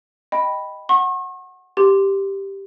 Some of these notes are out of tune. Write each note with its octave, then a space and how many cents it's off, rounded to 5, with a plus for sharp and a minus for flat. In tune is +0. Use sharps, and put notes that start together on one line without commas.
D#5 +0 G5 +0 B5 +0
F#5 +0 C#6 -40
G4 +0 C6 +0